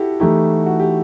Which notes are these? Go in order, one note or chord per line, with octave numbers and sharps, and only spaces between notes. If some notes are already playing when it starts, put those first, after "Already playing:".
Already playing: E4 F#4 G4 A4
E3 A3 D#4 E4 G4
F#4
G4